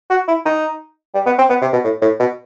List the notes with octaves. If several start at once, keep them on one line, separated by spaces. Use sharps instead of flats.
F#4
E4
D#4
G3
B3
C4
B3
C3
B2
A2
A2
B2